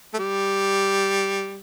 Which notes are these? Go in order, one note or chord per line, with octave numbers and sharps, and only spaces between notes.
A3
G3